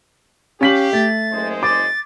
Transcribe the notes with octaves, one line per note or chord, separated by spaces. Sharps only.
C#4 G4 F5 B6 F#7
A3 A6
F#1 G#3 C5
D6 A6